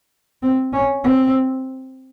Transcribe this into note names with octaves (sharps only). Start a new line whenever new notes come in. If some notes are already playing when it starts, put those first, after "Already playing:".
C4
C#4
C4